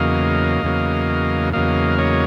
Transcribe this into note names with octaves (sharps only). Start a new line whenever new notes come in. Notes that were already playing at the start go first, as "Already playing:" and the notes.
Already playing: E2 C#3 F#3 A#3 D#5 F5
E2 C#3 F#3 A#3
E2 C#3 F#3 A#3 D#5 F5
C#5 D#5